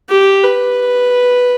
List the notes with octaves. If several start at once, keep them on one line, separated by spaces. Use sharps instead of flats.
G4
B4